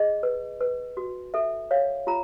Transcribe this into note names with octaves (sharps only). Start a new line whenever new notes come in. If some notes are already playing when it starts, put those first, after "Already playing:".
Already playing: G#4 D#5
B4
B4
F#4
A4 E5
C#5 F5
F4 A#5